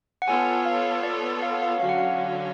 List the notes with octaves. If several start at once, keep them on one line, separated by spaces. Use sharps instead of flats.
F#5
B3 F4 A4 C#5 G#5
F5
D5
F5
F#5
F5
D3 F#3 C#4 F#4 C#5 F5
F#5
F5